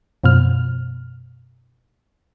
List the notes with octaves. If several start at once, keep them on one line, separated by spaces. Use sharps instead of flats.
F#2 B2 F3 F6